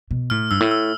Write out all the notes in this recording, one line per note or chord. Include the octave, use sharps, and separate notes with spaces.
B2
A2 F6
G2 E6
A2
E6